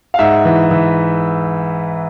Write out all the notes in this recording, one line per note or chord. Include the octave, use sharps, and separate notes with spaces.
F5
G#2 E5 F#5
E3
E3